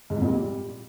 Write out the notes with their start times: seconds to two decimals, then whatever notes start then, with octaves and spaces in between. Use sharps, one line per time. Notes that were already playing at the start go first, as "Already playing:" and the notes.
0.10 G#2
0.16 F2
0.22 A#2
0.28 G3